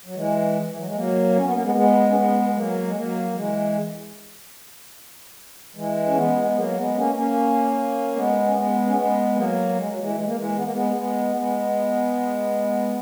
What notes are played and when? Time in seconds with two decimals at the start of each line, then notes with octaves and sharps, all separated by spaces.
0.05 F#3
0.16 E3 G#3
0.69 E3
0.77 F#3
0.87 G#3
0.95 F#3 A#3
1.36 C#4
1.44 B3
1.54 A#3
1.63 G#3 B3
1.75 G#3 B3
2.10 C#4
2.15 G#3 B3
2.49 B3
2.55 F#3 A#3
2.86 G#3
2.95 F#3 A#3
3.31 F#3
3.35 E3 G#3
5.76 E3 G#3
6.06 C#4
6.16 G#3 B3
6.44 B3
6.56 F#3 A#3
6.76 G#3 B3
6.96 A#3 C#4
7.15 A#3 C#4
8.15 G#3 B3
8.46 C#4
8.56 G#3 B3
8.86 C#4
8.96 G#3 B3
9.36 F#3 A#3
9.76 G#3
9.88 F#3
9.99 E3 G#3
10.15 G#3
10.26 A#3
10.36 E3 G#3
10.56 B3
10.64 A#3
10.72 G#3 B3
10.96 G#3 B3
11.36 G#3 B3